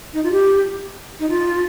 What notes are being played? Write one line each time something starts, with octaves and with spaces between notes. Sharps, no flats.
D#4
F4
G4
D#4
F4